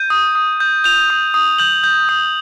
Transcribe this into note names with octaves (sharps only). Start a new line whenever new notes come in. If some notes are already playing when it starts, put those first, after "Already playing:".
Already playing: G6 D#7
D#6
D#6
G6
G6 F7
D#6
D#6
G6 F#7
G6
D#6